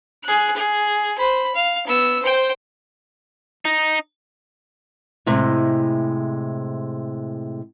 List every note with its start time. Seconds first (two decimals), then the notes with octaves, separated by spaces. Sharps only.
0.24 G#4 F#6
0.56 G#4
1.18 C5 B5
1.55 F5
1.87 B3 E6
2.23 C5 G5
3.65 D#4
5.26 A2 C3 G#3